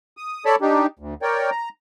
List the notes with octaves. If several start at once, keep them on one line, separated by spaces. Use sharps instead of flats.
D#6
A4 C#5 D5 A5 B5
D4 D#4 G4
D2
A#4 C#5 D5 G5
A#5